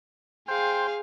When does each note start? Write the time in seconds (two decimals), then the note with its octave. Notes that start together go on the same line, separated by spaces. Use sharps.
0.48 G#4 C5 F5 G5